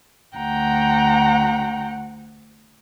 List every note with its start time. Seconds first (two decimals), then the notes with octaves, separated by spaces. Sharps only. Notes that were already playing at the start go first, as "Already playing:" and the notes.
0.37 D2 F#5 G5 A#5